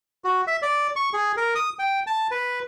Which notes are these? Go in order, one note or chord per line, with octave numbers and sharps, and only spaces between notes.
F#4
E5
D5
C#6
G#4
A#4
D#6
G5
A5
B4